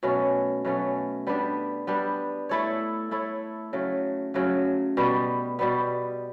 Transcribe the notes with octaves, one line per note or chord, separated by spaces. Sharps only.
B2 F#3 A3 C#4
B2 F#3 A3 C#4
G3 B3 D4
G3 B3 D4
A3 E4 A4 C#5
A3 E4 A4 C#5
C#3 F#3 A3
C#3 F#3 A3
B2 G3 B3
B2 G3 B3